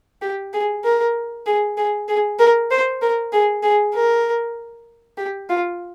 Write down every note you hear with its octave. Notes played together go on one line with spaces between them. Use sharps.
G4
G#4
A#4
G#4
G#4
G#4
A#4
C5
A#4
G#4
G#4
A#4
G4
F4